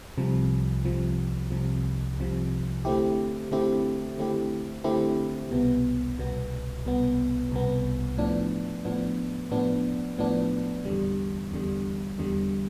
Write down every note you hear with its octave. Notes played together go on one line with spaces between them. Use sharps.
C2 C3 F3
C2 C3 F3
C2 C3 F3
C2 C3 F3
D3 A3 C4 E4 G4
D3 A3 C4 E4 G4
D3 A3 C4 E4 G4
D3 A3 C4 E4 G4
C2 B2 B3
C2 B2 B3
C2 B2 B3
C2 B2 B3
A2 F3 B3 D4
A2 F3 B3 D4
A2 F3 B3 D4
A2 F3 B3 D4
E2 D3 G3
E2 D3 G3
E2 D3 G3